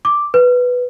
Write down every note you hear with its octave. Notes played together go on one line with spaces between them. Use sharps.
D6
B4